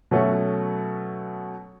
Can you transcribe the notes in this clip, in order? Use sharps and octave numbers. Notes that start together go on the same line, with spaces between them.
B2 F#3 A3 C#4 F#4